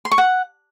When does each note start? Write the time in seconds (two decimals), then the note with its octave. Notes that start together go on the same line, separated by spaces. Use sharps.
0.05 C6
0.12 C#6
0.18 F#5